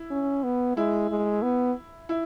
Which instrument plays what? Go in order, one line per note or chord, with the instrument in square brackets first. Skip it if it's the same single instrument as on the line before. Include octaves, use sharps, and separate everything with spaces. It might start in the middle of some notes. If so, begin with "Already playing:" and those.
Already playing: [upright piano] E4
[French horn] C#4
B3
[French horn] G#3 [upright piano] E4
[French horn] G#3
B3
[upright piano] E4